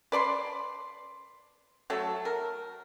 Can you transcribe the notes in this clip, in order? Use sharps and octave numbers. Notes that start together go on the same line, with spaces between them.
B4 D5 B5 C6
F#3 A3 A4
A#4